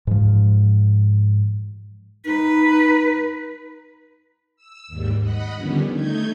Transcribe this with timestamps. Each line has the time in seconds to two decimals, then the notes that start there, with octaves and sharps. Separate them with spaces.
0.07 G#2 F3
2.26 D#4 B4
4.56 E6
4.87 D#2 G#2 G3
5.19 D#5 F#5 B5
5.55 D3 D#3 F3 G3 B3 C#4
5.92 A3 D#4 G6 G#6